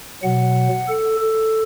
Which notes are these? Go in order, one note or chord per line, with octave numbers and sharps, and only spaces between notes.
B2 F#3 F#5
A4
A4